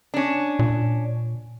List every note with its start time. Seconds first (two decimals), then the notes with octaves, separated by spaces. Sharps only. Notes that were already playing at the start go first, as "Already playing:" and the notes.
0.14 C#4 D4
0.59 A#2